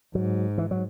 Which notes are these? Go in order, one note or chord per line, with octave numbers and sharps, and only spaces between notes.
G#2 F#3
E3
F#3